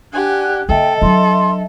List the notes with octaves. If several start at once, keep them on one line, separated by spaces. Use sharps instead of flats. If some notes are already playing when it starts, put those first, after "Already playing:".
D4 G4 F#5 G#5 F#6
D3 A#3 A4 D#5 E5 G5
F#3 D4 C6